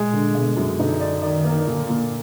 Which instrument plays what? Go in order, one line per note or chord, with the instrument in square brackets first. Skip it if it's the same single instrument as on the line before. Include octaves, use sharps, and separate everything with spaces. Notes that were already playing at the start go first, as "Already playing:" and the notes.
Already playing: [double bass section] A#2 [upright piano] G#3
[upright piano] D3
[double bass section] B2 [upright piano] G#3
[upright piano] F#2
[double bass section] D3 [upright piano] D#4
[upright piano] D5
[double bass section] D#3 [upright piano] D5
[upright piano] A#3
[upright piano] A#2 [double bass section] D3
[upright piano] A#2